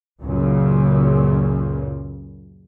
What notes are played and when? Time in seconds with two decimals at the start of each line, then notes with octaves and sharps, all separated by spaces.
0.22 C#2 F#2 A#2 C#3